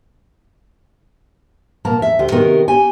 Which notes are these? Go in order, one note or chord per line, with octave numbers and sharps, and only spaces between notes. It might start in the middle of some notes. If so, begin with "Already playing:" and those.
B2 A#3 A5 A#5
E2 E5
D2 G4
C3 D#3 B3 F#4 G4 A#4
G4 G#5